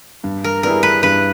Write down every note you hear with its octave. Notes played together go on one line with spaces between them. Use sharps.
G2
A#4
G3 B3 E4 G#4 A#4
B4
G2 B4